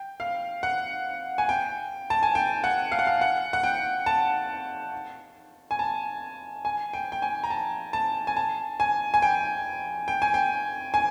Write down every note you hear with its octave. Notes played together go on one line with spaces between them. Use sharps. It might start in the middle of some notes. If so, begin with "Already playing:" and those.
Already playing: G5
F5
F#5
G#5
G5
A5
G#5
G5
F#5
F5
F#5
F5
F#5
F#5
G5
A5
G#5
A5
G#5
G5
G5
G#5
A#5
A5
A5
G#5
A5
G#5
G#5
G5
G5
G#5
G5
G#5